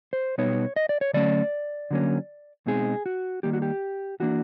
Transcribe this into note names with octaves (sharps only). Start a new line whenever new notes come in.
C5
B2 G3 B3 D#4 C#5
D#5
D5
C#5
D3 F#3 A3 C#4 D5
D3 F#3 A#3 C#4
B2 G#3 C4 D#4 G#4
F#4
D#3 G3 A#3 G4
F#4
G4
E3 G3 A#3 D4 F#4